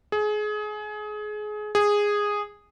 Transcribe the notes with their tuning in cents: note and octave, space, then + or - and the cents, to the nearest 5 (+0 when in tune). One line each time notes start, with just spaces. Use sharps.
G#4 +25
G#4 -10